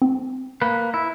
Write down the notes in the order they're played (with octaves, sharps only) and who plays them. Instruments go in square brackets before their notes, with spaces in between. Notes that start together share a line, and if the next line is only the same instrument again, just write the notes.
[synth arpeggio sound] C4
[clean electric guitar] A#3 B4
E4